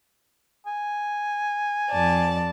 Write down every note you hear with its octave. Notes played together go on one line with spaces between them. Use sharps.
G#5
F2 D5 A5